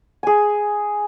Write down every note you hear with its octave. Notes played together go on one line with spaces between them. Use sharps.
G#4 G#5